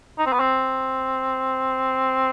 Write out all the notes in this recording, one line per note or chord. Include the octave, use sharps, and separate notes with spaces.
D#4
C4
B3
C4